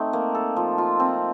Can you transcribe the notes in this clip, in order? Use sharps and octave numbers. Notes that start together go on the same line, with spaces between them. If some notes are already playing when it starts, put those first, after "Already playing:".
Already playing: A3 C4 D#4
A#3
A4
F3
F4
C4